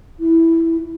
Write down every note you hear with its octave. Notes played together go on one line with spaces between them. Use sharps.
E4